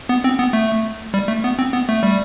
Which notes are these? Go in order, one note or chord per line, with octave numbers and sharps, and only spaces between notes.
B3
C4
B3
A3
G3
A3
B3
C4
B3
A3
G3